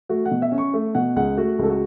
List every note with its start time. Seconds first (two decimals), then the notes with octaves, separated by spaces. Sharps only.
0.09 A3 F#4
0.25 F#5
0.31 B2
0.42 E5
0.52 C#4
0.58 C#6
0.74 A3
0.95 B2 F#5
1.16 C#2 F#5
1.37 A3 F#4
1.59 C#2 A4
1.70 F#4